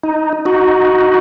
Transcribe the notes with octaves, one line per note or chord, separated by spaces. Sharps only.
D#4
D#4 F#4